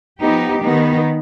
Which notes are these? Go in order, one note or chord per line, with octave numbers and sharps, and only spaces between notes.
F3 B3 D#4 G4
D#3 B3 D#4